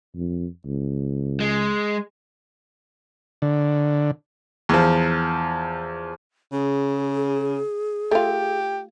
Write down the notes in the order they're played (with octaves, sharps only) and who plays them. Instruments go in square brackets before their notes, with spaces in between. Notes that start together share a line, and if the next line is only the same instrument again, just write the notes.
[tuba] F2
C#2
[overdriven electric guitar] G#3
[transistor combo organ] D3
[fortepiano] E2 F3
[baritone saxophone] C#3 [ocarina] G#4
[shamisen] A3 F4 [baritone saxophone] G4